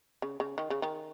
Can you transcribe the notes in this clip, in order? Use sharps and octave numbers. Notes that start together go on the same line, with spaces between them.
C#3
C#3
D#3
C#3
D#3